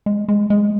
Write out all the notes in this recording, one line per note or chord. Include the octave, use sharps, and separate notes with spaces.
G#3
G#3
G#3